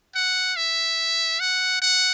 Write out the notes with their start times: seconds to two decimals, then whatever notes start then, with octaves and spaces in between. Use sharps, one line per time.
0.15 F#5
0.57 E5
1.40 F#5
1.82 F#5